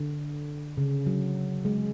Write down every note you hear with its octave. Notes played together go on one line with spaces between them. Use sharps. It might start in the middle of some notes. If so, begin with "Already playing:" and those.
Already playing: D3
C#3
F#3
G#3